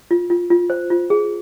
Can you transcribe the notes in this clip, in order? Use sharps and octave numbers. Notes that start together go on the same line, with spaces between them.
F4
F4
F4
C5
F4
G#4